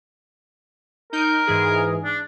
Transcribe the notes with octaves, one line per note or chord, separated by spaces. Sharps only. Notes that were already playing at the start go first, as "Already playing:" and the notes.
D#4 A#4 G6
G#2 E3 G#4
D4